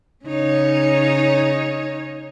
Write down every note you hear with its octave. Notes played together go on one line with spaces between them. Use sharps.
C#3 D#4 C#5